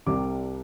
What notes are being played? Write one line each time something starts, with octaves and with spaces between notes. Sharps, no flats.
C2 C3 G3 D6